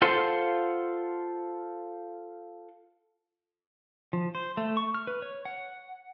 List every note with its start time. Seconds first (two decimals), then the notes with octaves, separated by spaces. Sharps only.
0.02 F4 A4 C5 F#5 C6
4.13 F3
4.35 C5
4.57 A3
4.77 C#6
4.95 F6
5.07 B4
5.22 C#5
5.45 F#5